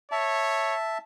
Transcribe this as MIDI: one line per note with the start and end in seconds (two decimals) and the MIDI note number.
0.11 0.75 73
0.11 0.98 76
0.11 0.98 81